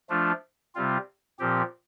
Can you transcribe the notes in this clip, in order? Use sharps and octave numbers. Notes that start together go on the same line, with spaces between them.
F3 A3 D4 F4
C3 G3 C4 F4
A#2 F3 C4 G4